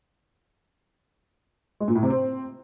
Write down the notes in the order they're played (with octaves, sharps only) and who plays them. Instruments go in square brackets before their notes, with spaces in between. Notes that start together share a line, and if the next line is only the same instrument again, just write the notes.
[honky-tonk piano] G#3
A#2
A2
C3
C4